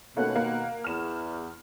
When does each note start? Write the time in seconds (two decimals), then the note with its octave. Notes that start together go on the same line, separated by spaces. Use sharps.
0.17 D#2 B2 A3 A#3 C#4 F#5
0.36 A#3
0.84 E2 F6 E7